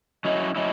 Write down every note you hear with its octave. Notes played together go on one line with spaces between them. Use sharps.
F#3 C#4 E4 D#5
F#3 C#4 E4 D#5